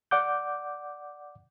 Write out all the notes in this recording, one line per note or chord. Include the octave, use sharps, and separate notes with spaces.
D5 F#5 D6 G6